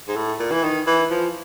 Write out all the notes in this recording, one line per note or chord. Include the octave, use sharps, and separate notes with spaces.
G#2
A2
A#2
E3
D#3
E3
F3